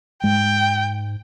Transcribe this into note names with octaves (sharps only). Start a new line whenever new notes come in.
G#2 G#3 G5